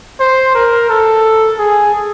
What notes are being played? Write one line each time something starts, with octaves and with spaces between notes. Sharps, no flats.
C5
A#4
A4
G#4